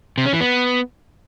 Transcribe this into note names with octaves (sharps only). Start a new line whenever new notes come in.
C3
C#4
E3
B3